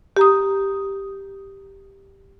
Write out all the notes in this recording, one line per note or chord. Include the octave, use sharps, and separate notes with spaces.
G4 A#5 D#6